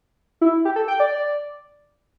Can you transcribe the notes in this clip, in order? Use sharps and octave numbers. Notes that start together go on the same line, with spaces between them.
E4
G4
A4
G5
D5